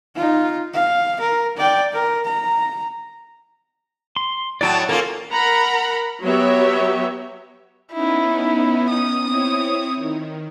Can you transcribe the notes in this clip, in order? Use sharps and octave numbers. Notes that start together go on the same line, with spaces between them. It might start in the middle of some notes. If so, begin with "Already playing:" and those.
D#4 F4
F5
A#4
D5 G5
A#4
A#5
C6
A2 F#3 D5 G5 A5
A#3 C#4 F4 A4 A#4
A#4 F#5 A#5 B5
F#3 B3 F#4 G4 C#5 E5
B3 C#4 D#4 E4
D#6
C4 E4 C#5
D#3